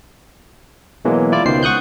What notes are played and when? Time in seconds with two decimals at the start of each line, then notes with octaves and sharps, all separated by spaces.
1.05 B2 E3 F#3 G#3 A#3
1.32 E4 F4 D5
1.46 C#2 B2 D#3 C5 C7
1.63 F#5 C#6 D#6 F#6 G6